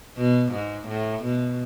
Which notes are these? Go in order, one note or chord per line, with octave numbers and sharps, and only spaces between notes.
B2
G#2
A2
B2